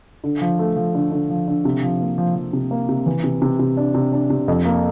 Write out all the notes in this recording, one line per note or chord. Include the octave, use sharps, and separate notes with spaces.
D3
F3
A3
F3
D3
D3
F3
D3
C3
F3
A#3
F3
F3
C3
A#3
C3
E3
C3
C3
C3
D4
C3
D4
C3
F2
A#3